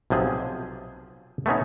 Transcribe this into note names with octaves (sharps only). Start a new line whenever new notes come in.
B1 C3 F3 G#4
A3 B3 C#4 D#4